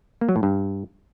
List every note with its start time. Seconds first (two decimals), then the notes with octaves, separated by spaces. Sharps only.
0.21 A#3
0.29 F#3
0.36 A2
0.43 G2